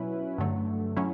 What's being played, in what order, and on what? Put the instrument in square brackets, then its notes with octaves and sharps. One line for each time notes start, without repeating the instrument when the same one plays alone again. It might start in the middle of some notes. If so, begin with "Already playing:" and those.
Already playing: [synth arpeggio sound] B2 F#3 C#4 E4 B4
G2 D3 F#3 A3
A2 F#3 C#4 E4